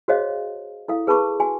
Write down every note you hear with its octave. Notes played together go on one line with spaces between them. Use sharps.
F#4 G#4 C5 C#5 D#5 F5
E4 A4 F5
G#4 B4 A5 B5 C#6 D6
F#4 G#5